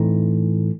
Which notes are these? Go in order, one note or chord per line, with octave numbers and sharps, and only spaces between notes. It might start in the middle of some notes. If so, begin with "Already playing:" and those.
Already playing: A2 E3 A3 C4 D#4